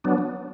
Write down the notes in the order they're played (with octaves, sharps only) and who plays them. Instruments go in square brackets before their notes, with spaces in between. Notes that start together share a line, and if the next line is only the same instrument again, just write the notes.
[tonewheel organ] F#3 B3 D4